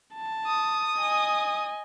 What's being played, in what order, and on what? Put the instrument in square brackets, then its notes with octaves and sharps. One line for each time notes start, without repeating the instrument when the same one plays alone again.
[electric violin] A5
[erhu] D#6
[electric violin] D#5 G#5